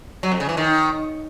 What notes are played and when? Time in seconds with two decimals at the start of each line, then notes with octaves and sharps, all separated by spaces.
0.23 F#3
0.32 F2
0.40 C#3
0.49 E3
0.57 D#3